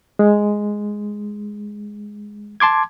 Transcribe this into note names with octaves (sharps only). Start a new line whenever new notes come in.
G#3
A5 C6 D6 G#6